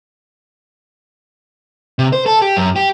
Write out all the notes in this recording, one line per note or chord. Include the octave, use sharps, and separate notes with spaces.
C3
C5
A4
G4
F#2
G4